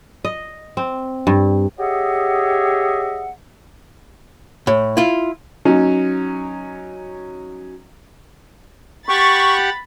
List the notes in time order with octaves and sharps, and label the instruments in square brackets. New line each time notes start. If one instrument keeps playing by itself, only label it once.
[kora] D#5
C4
G2
[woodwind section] G4 G#4 C#5 D#5 E5 F#5
[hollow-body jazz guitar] A2
E4 F4
[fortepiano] F#3 C#4 D#4
[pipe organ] G4 F#5 [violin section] B5 A6 [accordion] C#6